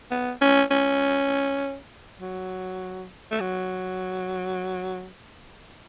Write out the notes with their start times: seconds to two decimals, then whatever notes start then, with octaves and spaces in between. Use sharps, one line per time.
0.11 B3
0.41 C#4
0.71 C#4
2.20 F#3
3.31 A3
3.40 F#3